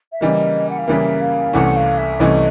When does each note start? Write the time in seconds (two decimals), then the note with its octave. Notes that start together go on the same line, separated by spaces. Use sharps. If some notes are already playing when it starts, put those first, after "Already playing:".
0.12 E5
0.21 C#3 E3 G3 A#3 D#5
0.69 F#5
0.78 F5
0.87 C#3 E3 G3 A#3 E5
1.21 F5
1.53 C2 C3 E3 A3 C#4 F#5
1.76 F5
1.97 E5
2.20 C2 C3 E3 A3 C#4 D#5